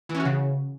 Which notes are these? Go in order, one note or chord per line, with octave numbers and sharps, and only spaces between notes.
E3
C#4
F#4
C#3